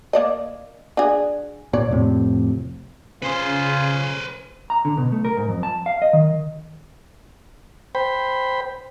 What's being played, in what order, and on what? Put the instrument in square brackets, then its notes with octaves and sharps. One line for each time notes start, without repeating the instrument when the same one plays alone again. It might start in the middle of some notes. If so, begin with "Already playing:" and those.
[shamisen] A#3 D5 D#5
D4 F#4 G#4
[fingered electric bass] A#2 [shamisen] C#5 D5
[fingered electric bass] F2 A2 C3
[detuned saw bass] C#3 [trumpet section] F4 G#4 [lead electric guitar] B4 C5
[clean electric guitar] A#5
D3
B2
A3
A#4
G#2
F2
A5
F5
D#5
D#3
[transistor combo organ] C5 G5 B5